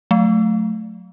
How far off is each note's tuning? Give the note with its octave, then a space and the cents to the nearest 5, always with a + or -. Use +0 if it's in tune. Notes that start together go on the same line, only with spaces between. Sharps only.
F#3 -25 A3 -5